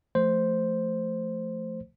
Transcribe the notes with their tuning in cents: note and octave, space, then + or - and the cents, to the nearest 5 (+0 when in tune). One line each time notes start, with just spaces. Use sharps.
F3 -5 A3 +0 C5 +0